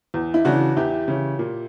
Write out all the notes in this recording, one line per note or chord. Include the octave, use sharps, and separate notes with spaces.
E2
E4
C#3 E3 D4 F#4
E2 E4 G4
C#3 E3
A#2